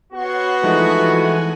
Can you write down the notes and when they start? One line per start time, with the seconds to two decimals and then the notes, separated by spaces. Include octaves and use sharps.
0.13 B3 F#4 C#5 C6 C#6
0.63 E3 F3 G#3 A3 D#4 G#5